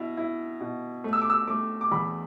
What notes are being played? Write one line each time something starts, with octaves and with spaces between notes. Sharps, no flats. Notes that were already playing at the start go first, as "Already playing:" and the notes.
Already playing: B2 E4
E4
B2
A3
E6
D6
E6
A3 D6
D6
E2 B5